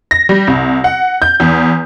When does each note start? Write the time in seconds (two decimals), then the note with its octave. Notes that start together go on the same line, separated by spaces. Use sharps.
0.11 A#6
0.29 G3
0.47 C2
0.84 F#5
1.22 G6
1.40 E2